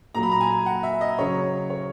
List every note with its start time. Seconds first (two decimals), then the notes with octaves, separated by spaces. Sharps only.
0.14 A#2 F#3 A#5
0.23 B5
0.31 A#5
0.41 G#5
0.66 F#5
0.83 E5
1.01 D#5
1.18 C#3 F#3 C#5
1.70 C#5